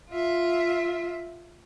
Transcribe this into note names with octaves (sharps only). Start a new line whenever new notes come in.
F4 E5